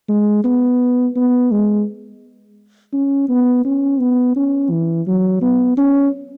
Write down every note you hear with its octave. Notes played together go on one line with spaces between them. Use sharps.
G#3
B3
B3
G#3
C#4
B3
C#4
B3
C#4
E3
F#3
B3
C#4